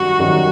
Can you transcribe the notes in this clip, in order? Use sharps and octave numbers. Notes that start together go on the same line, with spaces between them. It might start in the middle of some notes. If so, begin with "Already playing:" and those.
Already playing: F#2 D#3 G3 F#4
F#2 D#3 G3